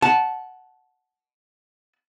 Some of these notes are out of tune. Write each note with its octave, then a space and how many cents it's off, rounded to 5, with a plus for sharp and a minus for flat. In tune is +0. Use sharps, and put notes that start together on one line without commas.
F#5 +0 A5 -15